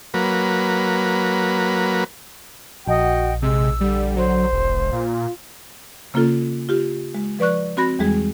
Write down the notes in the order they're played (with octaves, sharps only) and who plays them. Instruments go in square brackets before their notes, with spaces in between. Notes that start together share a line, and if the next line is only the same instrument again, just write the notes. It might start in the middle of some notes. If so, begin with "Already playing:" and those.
[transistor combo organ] F#3 A#3 B4
[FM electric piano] A#1 [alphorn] F#4 [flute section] D#5 F#5 G5
[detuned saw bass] C3 [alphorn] G#3 [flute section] E6
[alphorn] D3 [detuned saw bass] G3
[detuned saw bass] F#3 [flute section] C5
[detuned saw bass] E1
[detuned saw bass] A#2 [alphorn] F4
[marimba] C#3 A#3 C#4 F4 A4
F4 G4
G#3
F3 B4 D5 C#6 F#6
C4 F#4 B5 A#6
E2 E3 G3 G#3 G#4